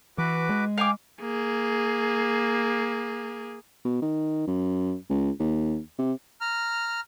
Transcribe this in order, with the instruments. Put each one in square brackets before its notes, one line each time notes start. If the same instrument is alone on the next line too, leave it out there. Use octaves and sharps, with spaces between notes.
[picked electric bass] E3 [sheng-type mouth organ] F#4 B4 D6
[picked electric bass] G#3
[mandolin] F5 G#5 D6 [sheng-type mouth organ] G5
[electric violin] A#3 G#4
[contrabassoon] B2
D#3
F#2
C#2
D#2
C3
[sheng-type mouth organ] A#5 F6